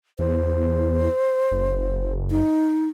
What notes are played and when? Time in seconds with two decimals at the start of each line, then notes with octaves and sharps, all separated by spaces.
0.19 E2 C5
1.52 F#1
2.30 D#4